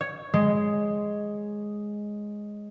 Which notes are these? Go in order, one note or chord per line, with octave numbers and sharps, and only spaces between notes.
C#5
G#3